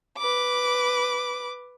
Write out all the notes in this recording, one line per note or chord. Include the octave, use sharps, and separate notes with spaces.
B4 D6